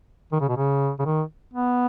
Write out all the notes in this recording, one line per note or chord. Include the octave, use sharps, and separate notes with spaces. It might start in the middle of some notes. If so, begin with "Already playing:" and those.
D#3
C#3
B2
C#3
C#3
D#3
B3